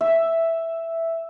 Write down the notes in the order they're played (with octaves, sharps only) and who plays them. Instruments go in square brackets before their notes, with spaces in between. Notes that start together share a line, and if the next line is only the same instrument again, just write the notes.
[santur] E5